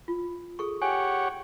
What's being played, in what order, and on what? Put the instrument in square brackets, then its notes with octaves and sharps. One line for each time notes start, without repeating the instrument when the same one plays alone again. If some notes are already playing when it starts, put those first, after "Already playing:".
[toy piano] F4
G#4 A4 C#6
[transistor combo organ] G4 C#5 F#5 [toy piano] G#5